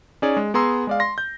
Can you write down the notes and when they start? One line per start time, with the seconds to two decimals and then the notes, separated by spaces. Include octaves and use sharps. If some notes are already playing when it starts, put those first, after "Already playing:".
0.22 C#4 D#4 G#4 C#5 D5
0.37 G#3
0.54 B3 G#4 A#5 C6 E6
0.87 G#3 D5 F5
1.00 C6 A#6
1.18 G6